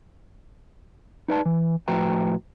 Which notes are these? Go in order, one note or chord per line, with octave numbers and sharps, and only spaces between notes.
D#4 B4 D5 A5
E3
A2 F3 F#4 B4 G5 A#5